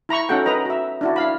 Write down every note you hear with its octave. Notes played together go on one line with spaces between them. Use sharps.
E4 A#5 B5 C#6
C#4 D#4 F#4 A4 F#5 G5
A#4 B4 D#5 A#5
F#4 E5
D4 E4 F#4
E4 F5 B5